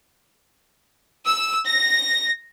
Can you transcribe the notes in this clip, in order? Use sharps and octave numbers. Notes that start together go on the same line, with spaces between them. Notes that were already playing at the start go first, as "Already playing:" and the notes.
E6
A#6